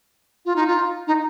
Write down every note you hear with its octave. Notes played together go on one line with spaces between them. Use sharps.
F4
D#4
F4
D#4